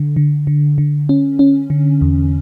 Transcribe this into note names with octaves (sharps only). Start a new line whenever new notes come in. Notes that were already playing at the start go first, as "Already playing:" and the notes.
Already playing: D3
D3
D3
D3
C#4
C#4
D3
E2